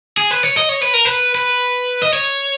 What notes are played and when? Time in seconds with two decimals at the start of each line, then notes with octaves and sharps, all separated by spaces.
0.17 G#4
0.31 B4
0.43 C#5
0.57 D#5
0.69 C#5
0.82 B4
0.94 A#4
1.05 B4
1.35 B4
2.02 D#5
2.13 C#5